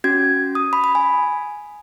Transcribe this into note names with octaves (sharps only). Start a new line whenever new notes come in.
C#4 F#4 G#6
D#6
B5
B5
G#5